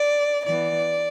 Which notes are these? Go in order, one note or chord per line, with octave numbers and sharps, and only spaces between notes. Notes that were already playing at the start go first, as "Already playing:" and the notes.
Already playing: D5
E3 B3 D5